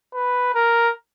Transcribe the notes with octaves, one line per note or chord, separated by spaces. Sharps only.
B4
A#4